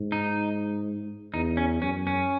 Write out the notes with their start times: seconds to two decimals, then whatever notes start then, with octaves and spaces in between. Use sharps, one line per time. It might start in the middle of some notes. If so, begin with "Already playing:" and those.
Already playing: G#2
0.12 D#4
1.34 E2 D#4
1.57 C#4
1.82 F#2 C#4
2.07 C#4